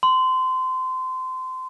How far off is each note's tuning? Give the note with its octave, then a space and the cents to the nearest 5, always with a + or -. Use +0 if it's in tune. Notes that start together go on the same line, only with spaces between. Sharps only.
C6 -25